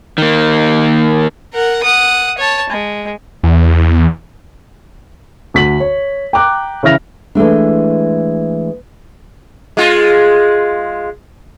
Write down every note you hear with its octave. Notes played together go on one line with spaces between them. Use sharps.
D#3 A#3
A#4 F#5
F#5 D#6
C#5 A5
G#3
E2
D2 B6 F#7
C#5
G5 A#5 D6 F#6
C#3 E3 E4 F6 A#6 F7
E3 G#3 A3 D4
G#3 F4